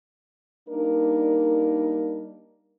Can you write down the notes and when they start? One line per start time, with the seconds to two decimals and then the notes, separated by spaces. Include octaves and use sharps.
0.69 G3 A#3 D4 D#4 A#4